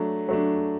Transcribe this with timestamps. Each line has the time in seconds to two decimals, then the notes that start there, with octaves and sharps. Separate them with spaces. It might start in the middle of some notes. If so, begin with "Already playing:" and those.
Already playing: F#3 A3 D4
0.29 F#3 A3 D4